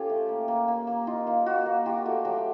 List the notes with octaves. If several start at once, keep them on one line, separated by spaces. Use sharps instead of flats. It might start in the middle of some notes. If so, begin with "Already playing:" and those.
Already playing: C#4 F4 G4 A4
A3
A#3
A#3
A#3
A#3
D#4 F4
A#3
A#3 F#4
A#3
F4 G4
A3 F#4
F#3 G4